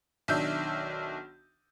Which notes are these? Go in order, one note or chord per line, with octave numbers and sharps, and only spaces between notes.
B1 D#3 D4 E5 G6